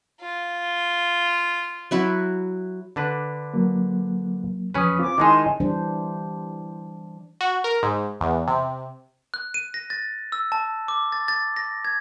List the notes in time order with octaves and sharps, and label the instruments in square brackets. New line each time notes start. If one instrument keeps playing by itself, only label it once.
[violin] F4
[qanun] F#3 E4 F#4
[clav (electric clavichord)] D3 D4 B4
[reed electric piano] F#3 A#3
[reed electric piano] E2 F3 D#6 [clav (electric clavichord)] C#4 B4
[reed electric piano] C4 F4 [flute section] D6
[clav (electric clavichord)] D#3 G#3 D#4 [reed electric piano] E4 [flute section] G#5 A5 C6
[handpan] E3 G3 D4 C5
[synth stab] F#4
A#4
G#2
E2
C3
[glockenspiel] F#6
D#7
A#6
A6
E6
A5
D6
A6
A6
A#6
G#6